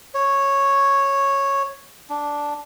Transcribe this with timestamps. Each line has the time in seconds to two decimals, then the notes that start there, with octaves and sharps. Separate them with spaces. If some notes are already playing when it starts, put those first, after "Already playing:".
0.14 C#5
2.10 D4